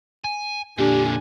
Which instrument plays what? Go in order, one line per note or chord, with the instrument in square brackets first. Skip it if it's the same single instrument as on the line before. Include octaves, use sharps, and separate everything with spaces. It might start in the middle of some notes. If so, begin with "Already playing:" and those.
[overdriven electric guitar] G#5
[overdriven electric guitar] A#2 D3 [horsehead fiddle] D4 G#5 [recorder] G4